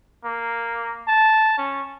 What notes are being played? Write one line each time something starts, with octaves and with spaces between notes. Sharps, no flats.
A#3
A5
C#4